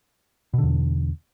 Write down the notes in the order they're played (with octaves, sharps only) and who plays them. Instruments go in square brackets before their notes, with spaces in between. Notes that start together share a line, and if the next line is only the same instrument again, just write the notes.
[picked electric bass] B2
D3
E2